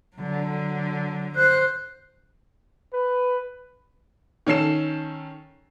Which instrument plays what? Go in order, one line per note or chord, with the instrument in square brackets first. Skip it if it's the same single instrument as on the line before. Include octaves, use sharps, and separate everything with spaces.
[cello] D3 F#3
[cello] C5 [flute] F#6
[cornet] B4
[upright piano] D#3 C#4 A4 C7 E7